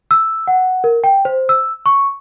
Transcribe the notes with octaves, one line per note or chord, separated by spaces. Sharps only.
E6
F#5
A#4
G5
C5
E6
C#6